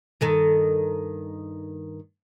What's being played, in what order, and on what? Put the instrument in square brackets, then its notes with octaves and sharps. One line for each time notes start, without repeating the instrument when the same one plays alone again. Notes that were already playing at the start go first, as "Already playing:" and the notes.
[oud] G2 D#3 A4